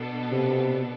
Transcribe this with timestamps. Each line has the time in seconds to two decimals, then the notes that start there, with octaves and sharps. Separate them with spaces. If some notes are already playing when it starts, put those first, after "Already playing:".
Already playing: B2 B3 D4 A4
0.32 C3